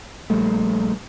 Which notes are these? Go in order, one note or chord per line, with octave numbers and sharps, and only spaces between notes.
A#1 G3 A3